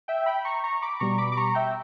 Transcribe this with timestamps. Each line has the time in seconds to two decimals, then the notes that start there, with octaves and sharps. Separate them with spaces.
0.08 E5 G5
0.26 G5 B5
0.45 A#5 C#6
0.64 A#5 C#6
0.82 B5 D6
1.00 B2 G3 A#5 C#6
1.18 B5 D6
1.32 D6
1.37 A#5 C#6
1.55 E5 G5